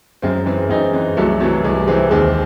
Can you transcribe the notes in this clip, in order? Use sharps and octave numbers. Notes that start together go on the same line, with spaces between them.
F#2 G#3 C4
E3 G#3 C4
F#2 C4 D#4
E3 G#3 C4
C2 F#3 A3
C3 E3 F#3 A3
C2 G#3
C3 E3 G#3 C4
D#2 G#3 C4